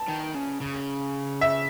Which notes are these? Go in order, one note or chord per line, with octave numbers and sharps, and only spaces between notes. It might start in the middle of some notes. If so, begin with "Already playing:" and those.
Already playing: A5
D#3
C#3
C#3
E5